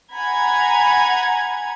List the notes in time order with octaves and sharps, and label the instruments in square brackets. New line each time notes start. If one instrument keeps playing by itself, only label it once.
[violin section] F#5 G#5 A#5 B5 G#6